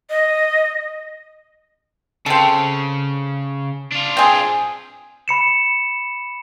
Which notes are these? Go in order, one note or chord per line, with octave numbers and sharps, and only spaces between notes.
D#5
C#3 C4 A4
D4 F4
C4 G#4
B5 C#7 E7